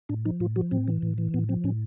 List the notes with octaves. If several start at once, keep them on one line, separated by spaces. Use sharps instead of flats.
A2 D4
F3 D#4
A2 F4
F3 F#4
A2 C4
E3
A2
E3
A2 B3
F3 C4
A2 C#4